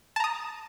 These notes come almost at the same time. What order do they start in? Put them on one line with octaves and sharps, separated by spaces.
A5 A#5 D#6